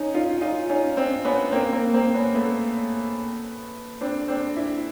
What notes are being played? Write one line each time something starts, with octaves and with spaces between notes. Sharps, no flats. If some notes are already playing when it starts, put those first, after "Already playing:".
Already playing: C#4 D#4
D#4 F4
D#4 F4
C#4 D#4
C4 D4
B3 C#4
A#3 C4
A#3 C4
A#3 C4
B3 C#4
A3 B3
C4 D4
C4 D4
D4 E4